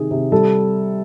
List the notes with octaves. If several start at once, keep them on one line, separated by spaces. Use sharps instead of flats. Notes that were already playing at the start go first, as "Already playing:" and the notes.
Already playing: C3 D#3 G#4
C3
G3 A4